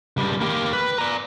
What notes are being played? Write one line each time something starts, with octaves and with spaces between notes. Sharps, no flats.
C#2 G3
A#3 G4
B4
D5 A#5